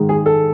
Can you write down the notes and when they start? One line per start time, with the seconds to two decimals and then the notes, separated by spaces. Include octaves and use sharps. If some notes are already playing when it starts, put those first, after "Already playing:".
Already playing: G#2 D#3 G#3
0.09 G#4
0.26 A4